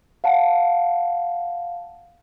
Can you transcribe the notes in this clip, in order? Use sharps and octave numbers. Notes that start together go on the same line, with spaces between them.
F5 F#5 A5